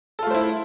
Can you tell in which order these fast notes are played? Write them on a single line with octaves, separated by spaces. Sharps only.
A4 F4 A3 C5 E4